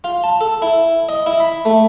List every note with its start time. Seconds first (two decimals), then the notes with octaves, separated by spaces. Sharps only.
0.04 F4
0.24 A5
0.41 A4
0.62 E4
1.09 D#5
1.26 E4
1.40 B5
1.65 A3